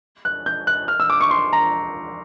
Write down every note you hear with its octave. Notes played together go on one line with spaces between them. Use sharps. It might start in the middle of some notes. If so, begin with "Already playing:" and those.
F#6
G6
F#6
F6
E6
D6
C#6
C6
A#5